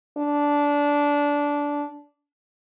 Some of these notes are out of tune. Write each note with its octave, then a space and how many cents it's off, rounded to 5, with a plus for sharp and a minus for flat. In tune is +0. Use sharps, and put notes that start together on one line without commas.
D4 -15